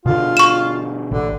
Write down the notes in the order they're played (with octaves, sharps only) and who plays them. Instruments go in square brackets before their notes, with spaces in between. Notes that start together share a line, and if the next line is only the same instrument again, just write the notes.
[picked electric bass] B2 D3 [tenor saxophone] F4
[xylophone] C#6 E7
[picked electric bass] A1 [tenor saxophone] D3